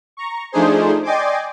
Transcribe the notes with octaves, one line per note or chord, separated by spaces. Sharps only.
A#5 C#6
F3 A3 D4 D#4 G#4 C5
D5 D#5 G5 G#5 C6 D6